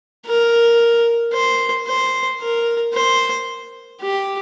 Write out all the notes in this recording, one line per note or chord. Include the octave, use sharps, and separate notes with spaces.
A#4
C5
C5
A#4
C5
G4